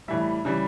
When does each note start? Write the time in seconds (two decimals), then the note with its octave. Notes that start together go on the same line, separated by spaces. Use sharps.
0.08 A2 E3 G3 E5
0.45 C#3 E3 G3